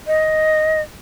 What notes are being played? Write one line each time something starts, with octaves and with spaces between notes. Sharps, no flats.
D#5